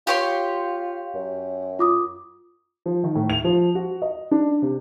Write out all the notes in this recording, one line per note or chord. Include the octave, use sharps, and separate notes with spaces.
F4 G4 C#5 C6
F#2
F4 D6 D#6
F3
D#3
A2
F7
F3
F#4
D#5
D4
C3